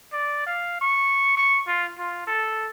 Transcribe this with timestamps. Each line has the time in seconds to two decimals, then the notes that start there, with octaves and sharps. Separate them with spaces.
0.13 D5
0.47 F5
0.81 C#6
1.37 C#6
1.68 F4
1.99 F4
2.27 A4